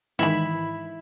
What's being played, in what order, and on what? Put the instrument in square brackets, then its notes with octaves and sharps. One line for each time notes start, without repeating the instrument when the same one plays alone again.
[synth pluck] G#2 D#3 E3 [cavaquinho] E4 B5